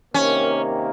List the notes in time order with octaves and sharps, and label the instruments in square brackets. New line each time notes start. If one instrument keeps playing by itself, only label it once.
[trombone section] C3 D#3 A#3 [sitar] C#4